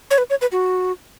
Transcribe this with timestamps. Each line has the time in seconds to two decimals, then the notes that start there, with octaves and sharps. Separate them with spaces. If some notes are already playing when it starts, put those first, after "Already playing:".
0.11 C#5
0.18 B4
0.30 C#5
0.41 B4
0.52 F#4